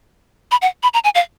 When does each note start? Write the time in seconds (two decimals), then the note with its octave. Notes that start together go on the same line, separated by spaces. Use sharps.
0.51 B5
0.62 F#5
0.83 B5
0.94 A#5
1.04 G#5
1.15 F5